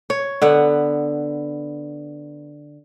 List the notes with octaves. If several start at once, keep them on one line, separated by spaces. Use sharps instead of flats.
C#5
D3 B3 F#5